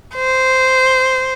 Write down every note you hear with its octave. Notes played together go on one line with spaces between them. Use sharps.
C5